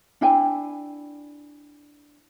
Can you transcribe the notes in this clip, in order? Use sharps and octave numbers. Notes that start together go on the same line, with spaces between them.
D4 E4 G5 G#5